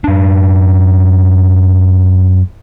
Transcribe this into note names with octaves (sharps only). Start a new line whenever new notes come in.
F#2 D4